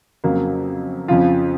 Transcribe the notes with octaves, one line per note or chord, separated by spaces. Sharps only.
F2 C#3 F#3 A#3
F2 C#3 F3 F4